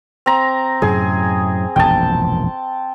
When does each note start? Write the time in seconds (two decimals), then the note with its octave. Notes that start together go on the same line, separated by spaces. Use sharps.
0.26 C4 A#5
0.82 F#2 A2 C3 G#4
1.76 E1 A#1 F#2 G5 A5